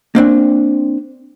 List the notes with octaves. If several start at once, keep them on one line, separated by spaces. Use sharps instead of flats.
A#3 C4 D4